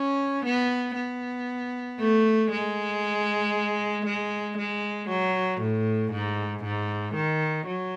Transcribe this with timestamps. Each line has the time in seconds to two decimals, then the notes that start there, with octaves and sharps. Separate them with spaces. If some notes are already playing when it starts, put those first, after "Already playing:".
Already playing: C#4
0.45 B3
0.96 B3
1.99 A3
2.51 G#3
4.05 G#3
4.57 G#3
5.09 F#3
5.61 A2
6.12 G#2
6.63 G#2
7.15 D#3
7.66 F#3